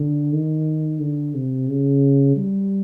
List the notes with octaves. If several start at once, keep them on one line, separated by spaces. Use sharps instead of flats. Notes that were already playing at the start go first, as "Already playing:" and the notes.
Already playing: D3
D#3
D3
C3
C#3
G3